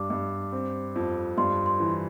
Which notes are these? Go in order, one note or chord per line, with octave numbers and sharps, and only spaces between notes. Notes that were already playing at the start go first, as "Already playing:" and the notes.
Already playing: G2 D4 D6
G2
C4
F2
G2 C6
C6
E3